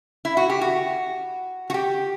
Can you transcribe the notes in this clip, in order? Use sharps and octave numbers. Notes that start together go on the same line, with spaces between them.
E4
F#4
G4
F#4
F#4
G4